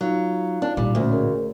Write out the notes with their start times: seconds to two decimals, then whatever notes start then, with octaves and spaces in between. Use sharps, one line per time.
0.01 F#3 D#4 F4 F5
0.62 D4
0.77 A1 A#2 G3
0.95 D2 A3 C#4
1.09 G#4 A#4 C#5